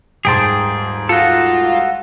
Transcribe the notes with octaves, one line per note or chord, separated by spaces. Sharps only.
D#1 G#2 G#4 G5 A5 C6
F4 F#4 A4